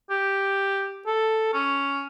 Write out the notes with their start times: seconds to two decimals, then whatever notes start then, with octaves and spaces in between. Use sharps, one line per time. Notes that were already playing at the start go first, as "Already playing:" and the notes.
0.10 G4
1.07 A4
1.54 C#4